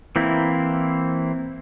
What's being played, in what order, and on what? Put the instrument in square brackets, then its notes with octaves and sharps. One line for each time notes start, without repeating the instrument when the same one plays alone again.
[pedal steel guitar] E3 A#3 C4 E4